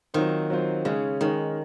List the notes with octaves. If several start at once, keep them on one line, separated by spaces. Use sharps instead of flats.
D#3 F#3 C4 F4 C5
F#3 C4 F4 C5
C#3 G#3 C#4 G#4 C#5
D#3 G#3 C#4 G#4 C#5